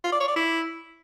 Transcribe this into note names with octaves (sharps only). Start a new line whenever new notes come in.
F4
D5
C#5
D5
E4